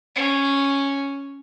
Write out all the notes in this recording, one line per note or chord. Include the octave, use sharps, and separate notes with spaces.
C#4